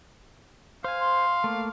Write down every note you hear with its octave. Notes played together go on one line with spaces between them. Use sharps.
C5 F5 G#5
C6
A3 A#3